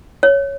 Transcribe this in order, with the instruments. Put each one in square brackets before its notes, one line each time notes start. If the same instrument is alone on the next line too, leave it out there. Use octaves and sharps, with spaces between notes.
[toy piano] C#5